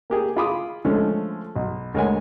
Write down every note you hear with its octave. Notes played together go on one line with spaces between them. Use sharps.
A#3 G4 G#4
F4 G#4 B5 D6 D#6
D3 F3 G#3 A3 C#4
B1
D2 G#3 A#4 C#5 F#5 G#5